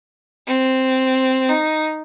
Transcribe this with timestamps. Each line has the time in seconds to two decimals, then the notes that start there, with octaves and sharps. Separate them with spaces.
0.47 C4
1.49 D#4